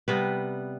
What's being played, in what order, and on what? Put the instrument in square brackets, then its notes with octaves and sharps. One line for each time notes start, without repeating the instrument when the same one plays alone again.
[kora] C3 G3 B3 B4